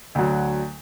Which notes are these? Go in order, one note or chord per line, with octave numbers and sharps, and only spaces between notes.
D2 F#3